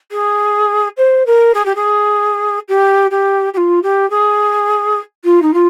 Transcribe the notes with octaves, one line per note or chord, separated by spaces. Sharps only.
G#4
C5
A#4
G#4
G4
G#4
G4
G4
G4
F4
G4
G#4
F4
D#4
F4